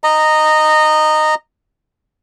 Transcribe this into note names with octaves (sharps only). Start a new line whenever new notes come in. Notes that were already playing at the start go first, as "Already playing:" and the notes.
D#5 A#5